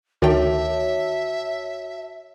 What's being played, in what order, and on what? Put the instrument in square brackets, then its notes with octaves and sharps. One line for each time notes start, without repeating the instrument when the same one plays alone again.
[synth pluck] D2 D#3 G5 [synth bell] F#4 C#5 A5 [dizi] E5